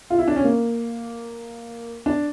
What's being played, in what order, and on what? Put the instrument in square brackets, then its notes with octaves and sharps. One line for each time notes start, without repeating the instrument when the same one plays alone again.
[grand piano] F4
E4
D4
C#4
A#3
D4